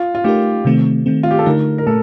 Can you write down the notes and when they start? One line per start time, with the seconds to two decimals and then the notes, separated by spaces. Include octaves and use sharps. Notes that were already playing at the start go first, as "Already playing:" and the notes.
Already playing: F4
0.15 F4
0.24 A3 D#4 G4 A#4
0.65 C3 D#3 A3 C4
1.06 D#3 A3 C4
1.23 F4
1.31 G4
1.39 A4
1.46 D3 A3 D#4 A#4
1.78 A#4
1.87 A#2 A3 A4